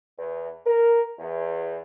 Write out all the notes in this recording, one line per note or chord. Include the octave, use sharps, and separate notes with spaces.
E2
A#4
E2